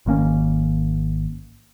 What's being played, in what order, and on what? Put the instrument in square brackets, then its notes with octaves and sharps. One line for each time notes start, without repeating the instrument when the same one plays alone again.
[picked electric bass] G#1 D#3 A#3 C#4